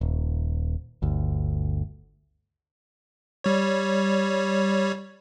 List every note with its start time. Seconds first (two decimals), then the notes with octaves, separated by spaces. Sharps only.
0.01 D#1
1.02 G1 D2
3.44 G3 C#5